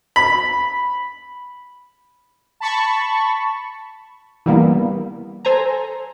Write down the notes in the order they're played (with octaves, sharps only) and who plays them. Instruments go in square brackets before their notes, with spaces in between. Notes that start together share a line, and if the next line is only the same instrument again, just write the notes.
[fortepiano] B5
[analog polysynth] A5 B5 C#6
[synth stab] E3 G3 A#3 B3
A4 C5 G#5 A#5